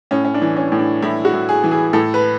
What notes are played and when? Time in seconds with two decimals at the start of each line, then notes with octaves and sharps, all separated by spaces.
0.11 A2 C#4
0.24 C#4
0.34 D4
0.42 E3
0.57 C#4
0.72 A2
0.79 D4
1.02 A2 E4
1.25 F#4
1.33 A2
1.49 G#4
1.64 E3
1.71 G#4
1.93 A2 A4
2.14 B4